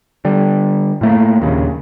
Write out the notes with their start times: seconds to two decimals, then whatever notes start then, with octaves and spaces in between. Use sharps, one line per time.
0.25 D3 G3
1.01 A2 A3 A#3
1.40 A#1 D#2 C#3